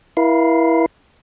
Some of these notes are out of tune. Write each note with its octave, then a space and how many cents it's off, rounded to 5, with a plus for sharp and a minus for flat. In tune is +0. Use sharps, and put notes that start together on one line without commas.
E4 +0 A#4 +45 F5 -10